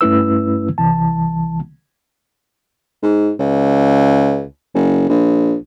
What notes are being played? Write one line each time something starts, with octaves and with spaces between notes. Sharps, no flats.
G2 A3 C#4 E4 B4 E6
C2 E3 A5
G#2
C#2
F#1
A#1